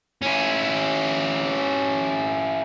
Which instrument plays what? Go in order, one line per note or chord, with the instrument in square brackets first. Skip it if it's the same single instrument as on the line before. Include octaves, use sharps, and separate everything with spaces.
[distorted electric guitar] C#4 E4